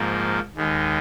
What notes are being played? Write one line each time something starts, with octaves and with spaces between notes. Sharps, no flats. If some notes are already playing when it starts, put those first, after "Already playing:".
Already playing: G#2 F3 A#3
D#2 D#3 G#3